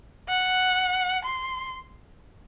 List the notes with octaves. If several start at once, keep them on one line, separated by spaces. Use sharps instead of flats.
F#5
C6